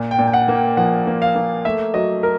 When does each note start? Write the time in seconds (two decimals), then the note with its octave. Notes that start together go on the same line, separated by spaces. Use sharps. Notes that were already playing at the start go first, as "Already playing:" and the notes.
Already playing: A#2
0.11 G5
0.19 A#2
0.27 G5
0.33 F#5
0.48 A#3
0.55 G5
0.77 F3 F#5
1.07 A#3
1.22 F5
1.36 A#3
1.65 A3 E5
1.94 F#3 D#5
2.23 A#4